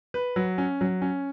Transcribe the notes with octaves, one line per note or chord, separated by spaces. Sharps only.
B4
F#3
C#4
F#3
C#4